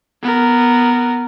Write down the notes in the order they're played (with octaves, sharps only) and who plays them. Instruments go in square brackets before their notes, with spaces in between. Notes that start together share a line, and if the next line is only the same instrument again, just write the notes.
[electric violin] B3 A#4